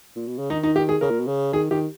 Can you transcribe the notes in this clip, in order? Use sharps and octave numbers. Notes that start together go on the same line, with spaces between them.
A#2
B2
C#3
D#3 D#4
D#4
G4
G#4
C#3 A#4
A#2
B2
C#3
D#3 G#4
D#3 G4